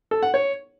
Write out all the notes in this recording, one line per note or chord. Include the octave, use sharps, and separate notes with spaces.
A4
F#5
C#5